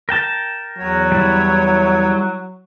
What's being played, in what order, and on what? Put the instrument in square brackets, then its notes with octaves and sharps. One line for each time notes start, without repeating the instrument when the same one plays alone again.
[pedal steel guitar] A#4 G5 A5
[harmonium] E2 C#5 [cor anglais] F#3
[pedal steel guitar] G3 E4